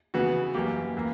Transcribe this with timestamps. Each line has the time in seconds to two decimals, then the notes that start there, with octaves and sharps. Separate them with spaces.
0.14 C#3 E3 B3 F#4
0.54 F#2 E3 G3 A#3 G4
0.97 E3 A#3